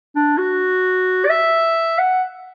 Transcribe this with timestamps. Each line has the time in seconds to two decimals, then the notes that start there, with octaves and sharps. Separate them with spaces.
0.15 D4
0.38 F#4
1.25 D5
1.30 E5
1.99 F#5